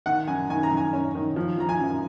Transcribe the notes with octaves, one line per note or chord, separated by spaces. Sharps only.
D#3 F#5
F#2 G#5
D#3 G#5
A#5
F#2
G#5
C#4
D#3
F3
F3 A#5
G#5
F#2